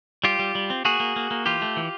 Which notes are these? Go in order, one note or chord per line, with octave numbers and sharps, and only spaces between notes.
G3 F4 G4
G3
G3
C4
A#3 F#4 G#4
A#3
A#3
A#3
E3 F4 G4
A3
E3